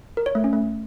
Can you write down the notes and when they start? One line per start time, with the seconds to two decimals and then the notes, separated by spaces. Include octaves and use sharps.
0.17 A#4
0.26 C#5
0.35 A3
0.44 C#4
0.53 A3